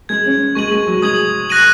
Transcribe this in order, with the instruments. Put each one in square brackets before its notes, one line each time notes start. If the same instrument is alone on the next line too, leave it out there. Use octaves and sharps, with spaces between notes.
[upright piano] G#3 [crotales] G#6 F#7
[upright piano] C#4
[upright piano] G#3 [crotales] C#6 G#6 D#7 F#7
[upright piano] G#3
F#3
[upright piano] G#3 [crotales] D#6 G#6 F#7
[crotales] F#6 A#6 D#7 F#7